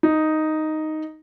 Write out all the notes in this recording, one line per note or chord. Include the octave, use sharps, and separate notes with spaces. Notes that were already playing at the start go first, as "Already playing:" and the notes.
D#4